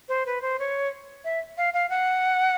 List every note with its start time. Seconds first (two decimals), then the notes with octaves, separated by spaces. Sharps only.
0.09 C5
0.26 B4
0.42 C5
0.59 C#5
1.25 E5
1.58 F5
1.74 F5
1.90 F#5